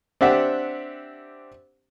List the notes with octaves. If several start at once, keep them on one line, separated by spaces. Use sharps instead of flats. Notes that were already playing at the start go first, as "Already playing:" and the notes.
C4 D4 G4 E5 F#5